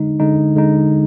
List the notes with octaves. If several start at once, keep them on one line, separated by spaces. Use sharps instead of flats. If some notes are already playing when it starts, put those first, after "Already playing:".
Already playing: D3 G#3 D#4
D3 G#3 D#4
D3 G#3 D#4